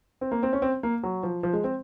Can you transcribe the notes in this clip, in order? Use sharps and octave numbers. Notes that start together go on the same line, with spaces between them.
C4
A#3
C4
C#4
C4
A#3
F#3
F3
F3
G#3
C4